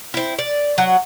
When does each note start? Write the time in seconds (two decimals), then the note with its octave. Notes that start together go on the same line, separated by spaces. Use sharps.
0.14 C4 E4
0.39 D5
0.78 F#3 F#5